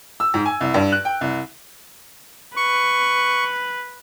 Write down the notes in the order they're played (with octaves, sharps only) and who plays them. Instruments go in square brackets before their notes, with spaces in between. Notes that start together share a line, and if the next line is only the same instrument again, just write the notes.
[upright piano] E6
G#2
G#5
C2
G2
F#6
G5
C2
[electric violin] B4 [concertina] C#6